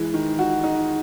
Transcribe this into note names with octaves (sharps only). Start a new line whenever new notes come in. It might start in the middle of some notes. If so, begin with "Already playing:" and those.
Already playing: E3 G#3
D#3
F#4
D#4